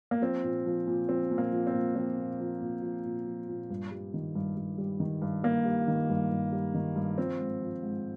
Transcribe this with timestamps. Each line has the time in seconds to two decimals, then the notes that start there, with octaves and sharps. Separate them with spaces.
0.11 A#3
0.21 F3 C4
0.44 A#2
0.66 F3
0.87 A#2
1.08 F3 C4
1.31 A#2
1.38 A#3
1.52 F3
1.67 C4
1.74 A#2
1.95 F3 C4
2.18 A#2
2.39 F3
2.61 A#2
2.82 F3
3.05 A#2
3.27 F3
3.49 A#2
3.70 G2
3.91 G3
4.14 D#3
4.35 G2
4.57 G2
4.78 G3
5.00 D#3
5.22 G2
5.43 G2 A#3
5.65 G3
5.88 D#3
6.09 G2
6.31 G2
6.52 G3
6.74 D#3
6.96 G2
7.18 F3 C4
7.39 G#2
7.62 F3
7.83 G#2